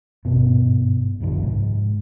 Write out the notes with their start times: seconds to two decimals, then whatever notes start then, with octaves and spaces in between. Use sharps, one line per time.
0.25 G#1 G2 B2 B3
1.20 F#1 C2 D#3 F3
1.43 G#2